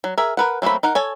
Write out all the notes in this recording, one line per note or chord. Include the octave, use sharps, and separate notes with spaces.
F#3
G#4 A#4 E5
A#4 B4 F#5
F#3 A3 A#3 C4 B5
D#4 A#4 F#5
A4 C#5 G#5